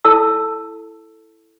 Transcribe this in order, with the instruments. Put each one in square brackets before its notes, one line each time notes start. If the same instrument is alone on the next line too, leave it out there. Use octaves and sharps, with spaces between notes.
[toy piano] E4 A4 A5 E6